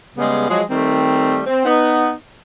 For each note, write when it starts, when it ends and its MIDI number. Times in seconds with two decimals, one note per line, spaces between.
0.17 0.46 49
0.17 0.46 55
0.17 0.46 56
0.17 0.46 59
0.48 0.63 53
0.48 0.63 54
0.48 0.63 56
0.70 1.42 51
0.70 1.42 55
0.70 1.42 57
0.70 1.42 60
1.46 1.65 60
1.65 2.12 59
1.65 2.12 63